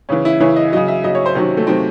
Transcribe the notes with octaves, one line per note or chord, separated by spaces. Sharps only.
C#3 E3 C#4
E4
C#3 E3 C#5
D#5
C#3 F#3 D#5
E5
C#3 F#3 D#5
C#5
C5
C3 D#3 F#3 C#4
A3
C3 D#3 F#3 C4